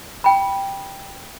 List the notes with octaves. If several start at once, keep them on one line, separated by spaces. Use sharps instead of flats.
G5 B5